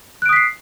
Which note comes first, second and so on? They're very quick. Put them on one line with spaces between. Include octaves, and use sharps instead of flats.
F#6 D7 D#6 B6 C7